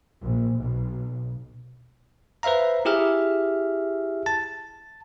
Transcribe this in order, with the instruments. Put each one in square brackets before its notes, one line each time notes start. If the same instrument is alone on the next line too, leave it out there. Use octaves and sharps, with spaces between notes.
[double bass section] A#1
B1
[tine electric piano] B4 C5 E5 F5 A#5
E4 G4 G#4 E5 F6
A5 A6